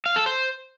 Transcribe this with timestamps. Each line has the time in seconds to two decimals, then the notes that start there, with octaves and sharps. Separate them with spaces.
0.06 F5
0.16 A4
0.26 C5